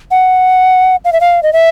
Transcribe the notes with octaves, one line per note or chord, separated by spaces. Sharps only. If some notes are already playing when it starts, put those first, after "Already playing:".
F#5
F5
E5
F5
D#5
E5